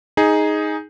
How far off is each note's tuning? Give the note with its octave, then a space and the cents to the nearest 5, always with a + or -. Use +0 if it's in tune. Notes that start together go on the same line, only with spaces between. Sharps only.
D#4 +5 G#4 +0